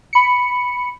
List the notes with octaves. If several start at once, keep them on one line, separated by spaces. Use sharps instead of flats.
B5 C#7